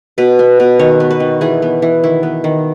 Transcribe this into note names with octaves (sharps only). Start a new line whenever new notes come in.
B2 B4
B3
B2
D#3 C#5
B3
B4
D#3
E3 G#4
B3
E3
D#3 E4
B3
D#3